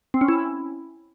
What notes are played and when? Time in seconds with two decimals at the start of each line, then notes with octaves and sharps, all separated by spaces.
0.14 C4
0.21 C#4
0.28 E4